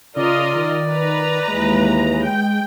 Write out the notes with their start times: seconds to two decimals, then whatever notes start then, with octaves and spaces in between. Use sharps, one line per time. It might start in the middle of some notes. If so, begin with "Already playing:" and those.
0.16 C#3 F4 A#4 D5 D#5
0.55 D#3
0.89 B4 A#5
1.48 D#2 E3 G#3
2.23 G5